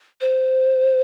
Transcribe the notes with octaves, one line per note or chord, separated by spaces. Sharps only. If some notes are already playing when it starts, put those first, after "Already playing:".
C5